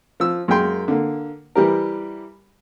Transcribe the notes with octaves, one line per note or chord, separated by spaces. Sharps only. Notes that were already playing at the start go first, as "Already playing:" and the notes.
F3 E6
F#2 G#3 A#3 G5 C6
D3 A#3
E3 G3 G4 A#4